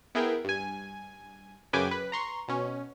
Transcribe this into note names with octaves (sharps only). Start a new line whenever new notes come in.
B3 E4 G#4 A#4 G5
G2 G#5
F#2 C#3 B4 G5 G#5 D6
B4
A#5 C6 C#6
B2 C#4